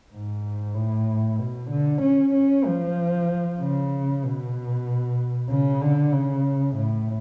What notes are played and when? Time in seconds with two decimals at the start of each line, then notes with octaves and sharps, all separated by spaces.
0.13 G#2
0.75 A2
1.39 B2
1.71 D3
2.02 C#4
2.34 C#4
2.66 F3
3.60 C#3
4.23 B2
5.50 C#3
5.82 D3
6.13 C#3
6.76 A2